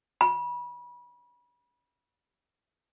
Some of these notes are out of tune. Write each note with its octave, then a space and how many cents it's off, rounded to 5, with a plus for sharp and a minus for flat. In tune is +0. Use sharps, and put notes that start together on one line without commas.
B5 -30